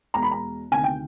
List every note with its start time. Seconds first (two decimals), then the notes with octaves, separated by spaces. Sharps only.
0.14 E2 B2 G#3 A#5
0.23 B5
0.31 A#5
0.71 D2 C3 D#3 G#5
0.84 G5